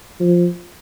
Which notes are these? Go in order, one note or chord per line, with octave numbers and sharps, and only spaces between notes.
F3